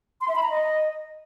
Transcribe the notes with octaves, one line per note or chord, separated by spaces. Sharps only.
C6
E5
B5
A#5
D#5